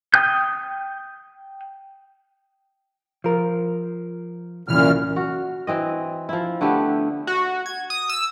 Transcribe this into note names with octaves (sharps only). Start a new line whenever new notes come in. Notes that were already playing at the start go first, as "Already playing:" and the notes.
G5 D#6 G6
F3 A#4
C2 F#2 A#2 E3 F6
F#4
E3 C4 D#5
F3 E4
D3 A3 B3 G4
F#4
G#6
D#6
E6